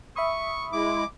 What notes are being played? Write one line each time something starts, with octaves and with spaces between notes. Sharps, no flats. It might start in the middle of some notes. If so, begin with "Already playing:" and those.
E5 B5 C#6 D#6
G#3 E4 D6